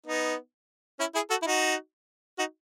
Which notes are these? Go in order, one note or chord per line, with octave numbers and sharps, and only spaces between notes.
B3 D#4
C#4 E4
E4 G#4
F#4 A4
E4
D#4 F#4
D#4 F#4